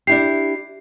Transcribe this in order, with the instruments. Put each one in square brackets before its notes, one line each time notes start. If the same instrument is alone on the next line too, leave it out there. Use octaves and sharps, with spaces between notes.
[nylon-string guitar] D4 E4 G4 [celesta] C7